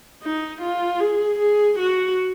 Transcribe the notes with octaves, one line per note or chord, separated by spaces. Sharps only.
D#4
F4
G#4
G#4
F#4